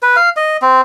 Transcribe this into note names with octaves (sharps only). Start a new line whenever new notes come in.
B4
F5
D#5
C4